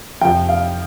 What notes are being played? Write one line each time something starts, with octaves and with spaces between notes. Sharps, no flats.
F2 C3 F3 G5
F5